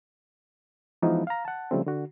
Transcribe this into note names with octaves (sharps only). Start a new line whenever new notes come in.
E3 F3 G#3 B3 D#4
F5 A#5
F#5 A5
C#3 F3 G3 A3 C4
D3 F#4